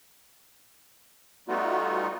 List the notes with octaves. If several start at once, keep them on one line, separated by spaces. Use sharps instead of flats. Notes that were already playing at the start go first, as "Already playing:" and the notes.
G3 A3 B3 D#4 F4 F#4